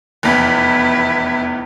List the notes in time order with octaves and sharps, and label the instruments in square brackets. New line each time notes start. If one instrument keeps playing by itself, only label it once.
[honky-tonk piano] F1 E2 [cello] E4 B4